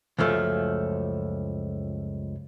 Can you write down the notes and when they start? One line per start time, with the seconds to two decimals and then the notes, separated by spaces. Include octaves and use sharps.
0.19 C#2 F#2 F3 A3